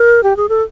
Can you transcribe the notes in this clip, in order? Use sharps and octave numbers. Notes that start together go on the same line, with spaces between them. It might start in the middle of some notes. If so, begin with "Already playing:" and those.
Already playing: A#4
G4
G#4
A4